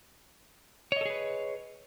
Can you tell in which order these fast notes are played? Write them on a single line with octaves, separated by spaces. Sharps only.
C#5 D#5 A4 G#4 B4